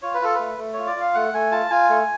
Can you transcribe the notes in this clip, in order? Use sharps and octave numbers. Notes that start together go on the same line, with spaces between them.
F4 C#5
B4
F4 A4
A3 B4
A3
F4 C#5
D5
F4 F5
A3 F#5
A3 G#5
F4 A5
F4 G#5
A3